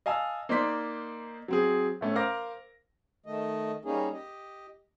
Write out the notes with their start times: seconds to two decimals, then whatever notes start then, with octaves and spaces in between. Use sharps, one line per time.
0.06 D#5 F5 G#5 A5 E6
0.49 A#3 D#4 C5 D5 C6 B6
1.48 F#3 C4 G#4
2.01 A2 A3 C#4
2.15 A#4 C5 F5 D6 A#6
3.26 D#3 A3 D#5
3.85 G3 A#3 C#4 D#4 G#4
4.13 G4 D#5